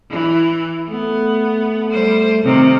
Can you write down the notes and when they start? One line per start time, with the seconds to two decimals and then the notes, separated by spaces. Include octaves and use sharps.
0.11 E3
0.90 A3 B3
1.90 G3 C5
2.44 C3 D#3 C4